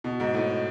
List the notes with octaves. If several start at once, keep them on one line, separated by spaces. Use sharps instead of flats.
B2
G#2
A2